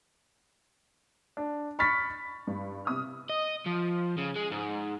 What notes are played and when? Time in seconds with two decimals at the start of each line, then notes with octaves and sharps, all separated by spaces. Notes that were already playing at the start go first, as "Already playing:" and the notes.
1.37 D4
1.79 B5 C#6 F6 A6 B6
2.47 G2
2.85 C3 D#6 F6
3.30 D#5
3.66 F3
4.18 C#3
4.36 G#3
4.52 G#2